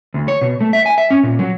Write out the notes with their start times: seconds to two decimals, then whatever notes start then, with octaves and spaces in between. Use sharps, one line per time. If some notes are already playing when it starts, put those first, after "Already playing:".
0.14 D2
0.28 C#5
0.41 B2
0.61 A3
0.73 E5
0.86 G#5
0.98 E5
1.10 C#4
1.23 A#2
1.39 F#3